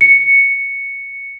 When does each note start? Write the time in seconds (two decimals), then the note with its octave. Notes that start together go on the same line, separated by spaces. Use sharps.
0.01 C#7